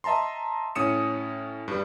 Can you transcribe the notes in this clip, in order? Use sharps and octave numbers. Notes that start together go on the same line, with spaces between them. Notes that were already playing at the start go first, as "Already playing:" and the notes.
D#5 E5 A5 A#5 C6
A2 C#4 D#6 C#7 E7
G2 G3